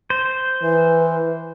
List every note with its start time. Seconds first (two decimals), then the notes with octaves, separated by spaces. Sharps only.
0.10 C5
0.63 E3 B4